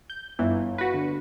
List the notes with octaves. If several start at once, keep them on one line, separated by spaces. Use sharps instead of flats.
G6
G1 E3
F#4 B4
D3